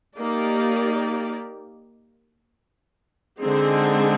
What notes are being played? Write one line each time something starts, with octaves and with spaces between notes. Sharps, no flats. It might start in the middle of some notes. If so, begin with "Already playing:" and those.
A#3 D#4 G4 D5
D3 G#3 C4 D#4 G#4